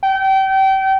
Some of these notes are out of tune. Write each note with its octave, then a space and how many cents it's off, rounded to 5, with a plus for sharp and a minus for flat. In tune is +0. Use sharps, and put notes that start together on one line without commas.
G5 -30